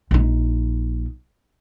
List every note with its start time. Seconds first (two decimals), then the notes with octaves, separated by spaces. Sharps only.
0.11 A#1 D#4